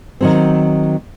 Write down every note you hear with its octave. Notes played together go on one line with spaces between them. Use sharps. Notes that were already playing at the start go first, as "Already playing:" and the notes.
D#3 F#3 C4